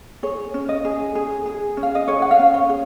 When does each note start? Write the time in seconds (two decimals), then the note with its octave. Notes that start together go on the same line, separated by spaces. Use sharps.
0.23 G#4 C#5
0.54 C#4
0.69 D#5
0.85 G#4
1.15 G#4
1.46 G#4
1.77 C#4
1.83 F5
1.95 D#5
2.08 G#4 C#5
2.22 F#5
2.31 F5
2.39 C#4
2.54 C#5
2.69 G#4